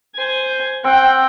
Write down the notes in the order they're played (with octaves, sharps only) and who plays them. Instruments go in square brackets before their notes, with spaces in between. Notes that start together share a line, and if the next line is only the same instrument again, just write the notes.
[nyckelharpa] C5 G#5
[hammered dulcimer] C4 [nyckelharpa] F#5 G5